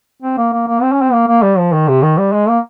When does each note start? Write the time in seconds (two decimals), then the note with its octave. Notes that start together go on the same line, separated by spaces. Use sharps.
0.22 C4
0.38 A#3
0.53 A#3
0.68 A#3
0.82 C4
0.92 C#4
1.02 C4
1.12 A#3
1.27 A#3
1.43 G3
1.58 F3
1.73 D#3
1.88 C3
2.03 D#3
2.18 G3
2.33 G#3
2.49 A#3